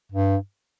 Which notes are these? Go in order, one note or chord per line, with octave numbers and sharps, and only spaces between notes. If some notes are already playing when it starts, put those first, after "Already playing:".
G2